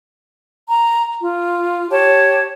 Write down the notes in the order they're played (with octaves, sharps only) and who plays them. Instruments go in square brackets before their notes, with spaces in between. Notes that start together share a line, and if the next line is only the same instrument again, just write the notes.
[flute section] A#5
F4
G4 C#5 A5